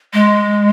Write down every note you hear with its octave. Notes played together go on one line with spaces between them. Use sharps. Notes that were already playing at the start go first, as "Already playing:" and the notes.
G#3